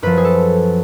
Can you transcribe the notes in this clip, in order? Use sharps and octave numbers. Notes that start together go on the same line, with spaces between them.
F#2 F3 B4
G#4
A4